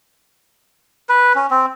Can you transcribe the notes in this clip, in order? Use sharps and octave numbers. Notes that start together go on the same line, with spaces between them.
B4
C#4
C4